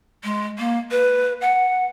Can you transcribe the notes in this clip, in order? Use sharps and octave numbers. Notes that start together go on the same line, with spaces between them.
G#3
A#3
B4
F#5